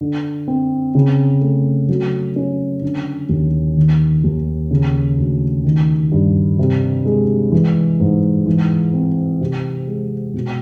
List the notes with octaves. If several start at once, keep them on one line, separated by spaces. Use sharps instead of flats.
D3
C4
C#3
A3
F#3
C#4
D3
D#2
D#3
D#2
C#3
D2
D#3
G2
C3
G#3
E3
G#2
E3
C4
C3
G#3
B2